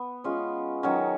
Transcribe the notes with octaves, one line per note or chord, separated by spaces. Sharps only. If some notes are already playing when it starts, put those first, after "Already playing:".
Already playing: B3
G#3 C#4 F4
D#3 F#3 C#4 F#4